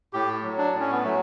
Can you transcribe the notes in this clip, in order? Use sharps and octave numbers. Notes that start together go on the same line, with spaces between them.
A2 G4
F#3
D4
A2
C#4
B3
F#3 A3